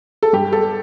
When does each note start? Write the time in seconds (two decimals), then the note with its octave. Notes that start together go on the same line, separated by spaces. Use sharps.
0.23 A4
0.33 G2 G4
0.53 A4